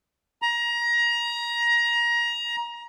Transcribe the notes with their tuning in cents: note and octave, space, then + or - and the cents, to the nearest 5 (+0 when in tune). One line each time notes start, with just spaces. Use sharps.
A#5 +25